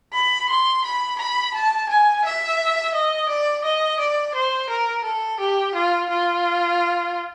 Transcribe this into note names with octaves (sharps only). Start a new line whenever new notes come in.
B5
C6
B5
B5
A5
G#5
E5
D#5
D5
D#5
D5
C5
A#4
A4
G4
F4
F4